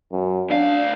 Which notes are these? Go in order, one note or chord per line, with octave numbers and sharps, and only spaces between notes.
F#2
D2 D4 F5